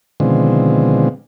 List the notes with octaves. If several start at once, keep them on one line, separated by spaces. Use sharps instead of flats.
B2 D3 D#3 F3 G#3 C4